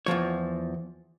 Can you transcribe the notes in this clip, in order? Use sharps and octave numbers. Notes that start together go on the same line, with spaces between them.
E2 G#2 F3 C#5